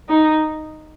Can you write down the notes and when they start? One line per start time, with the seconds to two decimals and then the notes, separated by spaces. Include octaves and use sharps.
0.09 D#4